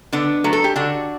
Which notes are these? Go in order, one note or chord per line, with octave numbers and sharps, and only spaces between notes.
D3 B3 D4
F#3 A3
A4
G4
D3 D4 F#4